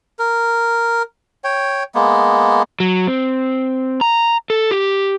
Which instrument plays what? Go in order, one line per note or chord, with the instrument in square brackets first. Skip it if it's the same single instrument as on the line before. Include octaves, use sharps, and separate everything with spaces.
[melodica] A#4
C#5 G5
G#3 A#3 B3
[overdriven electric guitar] F#3
C4
A#5
A4
G4